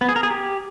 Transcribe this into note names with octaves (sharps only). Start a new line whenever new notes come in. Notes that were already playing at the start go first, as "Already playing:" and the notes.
B3
G#4
A#4
G#4
G4